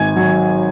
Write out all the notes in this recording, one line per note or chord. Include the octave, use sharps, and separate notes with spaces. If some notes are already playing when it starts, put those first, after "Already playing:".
Already playing: G#1 G#5 G#6
F#3